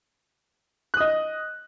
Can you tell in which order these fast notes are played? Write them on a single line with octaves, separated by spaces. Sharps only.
F#6 D#6 D#5